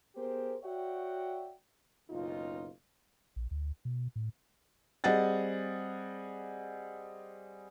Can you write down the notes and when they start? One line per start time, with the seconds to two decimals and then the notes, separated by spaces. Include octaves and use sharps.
0.16 B3 G4 G#4 A#4 C5
0.63 F#4 C#5 D5 E5 F#5 G5
2.09 F#1 C#2 B2 D#4 F4
3.36 A#1
3.51 D2
3.85 B2
4.16 A2
5.04 G3 C4 G#4 D#5 F#5 A6